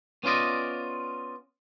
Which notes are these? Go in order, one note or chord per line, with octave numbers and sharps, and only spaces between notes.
B3 C#4 F4 D5 D#5